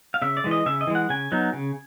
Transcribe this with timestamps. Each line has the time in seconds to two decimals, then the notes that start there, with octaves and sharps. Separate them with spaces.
0.14 F5
0.22 C#3 E5
0.37 D5
0.44 E3 G#3
0.51 D#5
0.66 C#3 E5
0.81 D#5
0.87 E3 G#3
0.95 F#5
1.10 C#3 G#5
1.32 F#3 B3 D#4
1.53 C#3